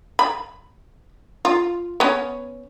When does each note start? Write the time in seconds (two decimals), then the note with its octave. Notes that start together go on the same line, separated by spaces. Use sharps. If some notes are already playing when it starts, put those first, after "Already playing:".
0.19 B5
1.45 F4
2.00 B3 C#4